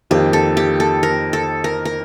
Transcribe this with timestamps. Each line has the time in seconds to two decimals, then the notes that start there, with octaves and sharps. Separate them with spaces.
0.11 F2 D#3 A#3 G4
0.33 A4
0.57 G4
0.80 A4
1.03 A#4
1.33 A4
1.64 A#4
1.85 A#4